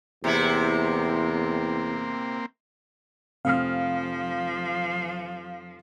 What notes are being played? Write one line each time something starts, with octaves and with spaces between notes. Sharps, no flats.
E2 C3 A#3 C4 E4
F1 F3 C4 F5 D#6 F6